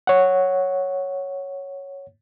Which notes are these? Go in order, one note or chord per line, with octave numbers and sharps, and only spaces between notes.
C#5 F#5